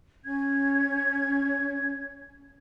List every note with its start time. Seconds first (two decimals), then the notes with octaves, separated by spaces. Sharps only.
0.24 C#4 G#6